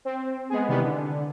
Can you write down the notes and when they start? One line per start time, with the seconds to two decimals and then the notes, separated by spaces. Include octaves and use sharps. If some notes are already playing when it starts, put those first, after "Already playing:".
0.05 C4
0.49 G#3 B3 G#4
0.68 C3 D#3 E3 G3 B3
0.82 D3